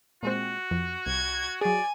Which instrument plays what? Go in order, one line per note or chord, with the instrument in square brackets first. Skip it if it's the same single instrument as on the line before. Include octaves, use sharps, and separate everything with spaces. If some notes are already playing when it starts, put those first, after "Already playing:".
[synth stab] A#2 G#3 C4 [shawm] F#4
[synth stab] F2
[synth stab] C2 [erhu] G#6
[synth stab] F#3 G#4 [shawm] D5 [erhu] G#5